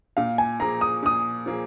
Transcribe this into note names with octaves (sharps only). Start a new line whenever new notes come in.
A#2 F5
G#5
F3 A#3 G#4 A#5
D#6
A#2 D#6
F3 A#3 G#4